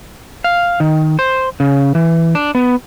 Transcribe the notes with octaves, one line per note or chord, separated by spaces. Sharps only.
F5
D#3
C5
C#3
E3
D4
B3